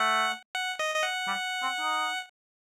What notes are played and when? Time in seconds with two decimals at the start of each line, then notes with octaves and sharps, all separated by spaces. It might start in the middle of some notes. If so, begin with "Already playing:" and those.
Already playing: A3 F#5
0.55 F#5
0.79 D#5
0.95 D#5
1.03 F#5
1.27 G3
1.62 C4
1.81 D#4